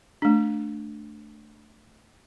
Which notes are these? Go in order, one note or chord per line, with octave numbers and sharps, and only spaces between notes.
A3 D4